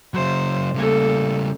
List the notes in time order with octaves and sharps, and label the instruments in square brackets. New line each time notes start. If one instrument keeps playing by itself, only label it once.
[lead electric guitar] C#3 F#3 [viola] C5
[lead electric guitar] C#3 G3 [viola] A#3 A4